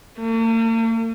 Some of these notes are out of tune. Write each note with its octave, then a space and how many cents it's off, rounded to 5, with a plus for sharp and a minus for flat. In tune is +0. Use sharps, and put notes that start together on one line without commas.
A#3 -45